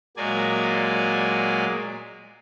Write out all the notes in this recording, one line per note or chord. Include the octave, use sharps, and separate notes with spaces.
A#2 F#3 G#3 A#3 D5 G#5